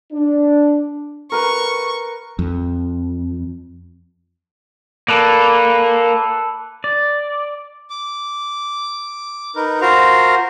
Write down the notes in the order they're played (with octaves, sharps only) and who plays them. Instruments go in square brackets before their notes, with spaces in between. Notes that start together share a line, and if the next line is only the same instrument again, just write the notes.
[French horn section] D4
[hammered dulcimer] A#4 B4 [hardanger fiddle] C#6
[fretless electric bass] F2
[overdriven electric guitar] A#3 [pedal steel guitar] A4 B4 D5
[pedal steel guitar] D5
[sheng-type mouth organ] D6
D#4 A#4 B4
F4 F#4 A#4 C5 A#5